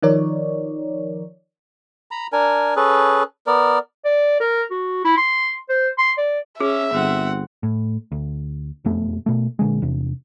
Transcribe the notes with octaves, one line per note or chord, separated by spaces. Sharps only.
D#3 F3 D#4 A#4 C#5 D5
A#5 B5
D4 A#4 G#5
C#4 G#4 A4 B4
B3 A#4 D5
D5
A#4
F#4
E4
C6
C5
C6
D5
C#4 G#4 E5
G1 C4 F#5
A2
D2
E1 F2 A3 B3
B2 A3
A#2 D3 G#3
E2 C3